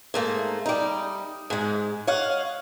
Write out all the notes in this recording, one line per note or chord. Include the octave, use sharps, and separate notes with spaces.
G#2 A3 A#3
G3 D#4
G#2 G#3
C#5 D#5 F5 F#5